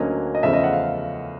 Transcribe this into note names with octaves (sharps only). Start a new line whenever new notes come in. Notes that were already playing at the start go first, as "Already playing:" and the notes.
Already playing: D2 D3 F#3 A#3 C#4 D#5
D#5
E2 C#3 F3 A3 E5
D#5
F#5
F5